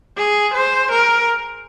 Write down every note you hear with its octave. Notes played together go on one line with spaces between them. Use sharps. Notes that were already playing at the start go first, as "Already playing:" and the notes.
G#4
C5
A#4